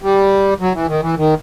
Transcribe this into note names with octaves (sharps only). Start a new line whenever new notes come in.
G3
F#3
E3
D#3
E3
D#3